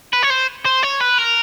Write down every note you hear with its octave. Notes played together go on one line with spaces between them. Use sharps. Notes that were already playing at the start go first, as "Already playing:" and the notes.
B4
C#5
C5
C5
C#5
B4
A#4